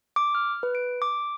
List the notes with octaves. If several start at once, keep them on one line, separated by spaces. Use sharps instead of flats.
D6
F6
B4
D7
D6